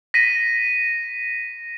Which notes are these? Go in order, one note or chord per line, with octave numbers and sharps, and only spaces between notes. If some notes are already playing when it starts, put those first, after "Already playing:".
A#6 B6 D#7